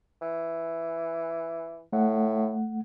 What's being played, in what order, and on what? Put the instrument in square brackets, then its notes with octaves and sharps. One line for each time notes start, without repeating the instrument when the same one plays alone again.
[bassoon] E3
[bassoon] A2 [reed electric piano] A3 F#5